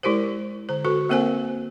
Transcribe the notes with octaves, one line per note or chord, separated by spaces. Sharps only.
G#3 E4 G4 A#4 C5
D3 C5
F#4 A4 B4
A#3 C4 A#4 C5 F5 G#5